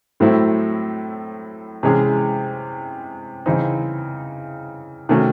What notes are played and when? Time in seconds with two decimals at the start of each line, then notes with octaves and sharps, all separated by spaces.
0.20 A2 F#3 A3 C4 E4
1.83 C3 E3 G#3 C#4 G#4
3.46 C#3 E3 C4 D#4
5.09 C3 D#3 A3 C#4 F#4